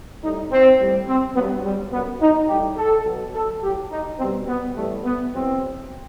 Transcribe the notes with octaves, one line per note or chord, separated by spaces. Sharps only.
A2 G3 D#4
C4
A2 G3
C4
G2 F#3 B3
G3
F#2 F#3 B3
D#4
A2 G3 G4
A4
B2 F#3
A4
A2 F#3 G4
D#4
B2 G3 C4
B3
A2 E3 G3 A3
B3
E2 B2 F#3 C4